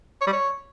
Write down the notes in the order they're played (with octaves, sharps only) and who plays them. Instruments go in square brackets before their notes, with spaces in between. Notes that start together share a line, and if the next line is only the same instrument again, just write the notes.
[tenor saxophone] C#5
G3
C#5